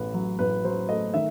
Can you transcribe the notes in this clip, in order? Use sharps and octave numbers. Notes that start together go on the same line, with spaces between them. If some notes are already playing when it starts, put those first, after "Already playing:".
Already playing: A1 A3 B4
F#3
A1 B4
F#3 C5
A3 D#5
D#3 E5